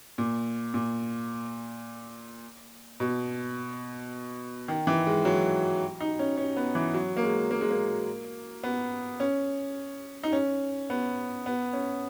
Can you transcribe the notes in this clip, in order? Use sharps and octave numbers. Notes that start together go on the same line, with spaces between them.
A#2
A#2
B2
D#3
E3
G#3
F#3
D#4
C#4
C#4
B3
E3
F#3
A#3
G#3
A#3
G#3
A#3
B3
C#4
D#4
C#4
B3
B3
C#4